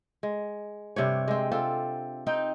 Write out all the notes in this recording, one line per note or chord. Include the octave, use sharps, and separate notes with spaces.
G#3
G2 C3 D4 C#5
G#3 C4
C4 F4 G4 A4
C4 D#4 G5